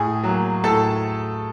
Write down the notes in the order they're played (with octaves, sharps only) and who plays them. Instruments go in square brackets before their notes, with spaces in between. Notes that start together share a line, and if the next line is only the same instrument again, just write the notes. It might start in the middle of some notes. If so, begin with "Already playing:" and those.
Already playing: [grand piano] A2 G#4 G#5
F#3 A#3
A2 A4 A5